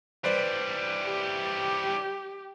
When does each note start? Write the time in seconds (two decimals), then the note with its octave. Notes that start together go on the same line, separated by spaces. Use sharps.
0.24 E3 G3 B4 C5 D5
1.05 G4